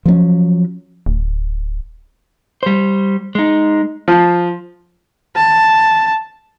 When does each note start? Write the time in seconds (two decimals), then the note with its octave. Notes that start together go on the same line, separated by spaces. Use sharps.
0.06 F3 F#3 A#3 C#4
1.06 D1
2.63 G3 C5
3.35 G#3 D#4
4.08 F3
5.36 A5